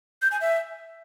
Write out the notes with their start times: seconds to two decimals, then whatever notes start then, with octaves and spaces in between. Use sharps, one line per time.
0.22 G6
0.31 G#5
0.41 E5